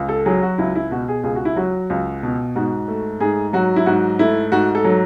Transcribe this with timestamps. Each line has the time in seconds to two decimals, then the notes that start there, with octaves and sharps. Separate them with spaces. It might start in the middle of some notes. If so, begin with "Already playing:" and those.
Already playing: C#2
0.09 A4
0.26 F#3 G#4
0.43 F#4
0.58 C#2 E4
0.75 E4
0.91 B2 F#4
1.08 G#4
1.23 C#2 G#4
1.36 F#4
1.45 E4
1.56 F#3 F#4
1.90 C#2
2.23 B2
2.56 G#2 F#4
2.88 A3
3.20 G#2 G#4
3.53 F#3 F#4
3.76 E4
3.86 G#2 F#4
4.19 A3 E4
4.52 G#2 F#4
4.75 A4
4.85 F#3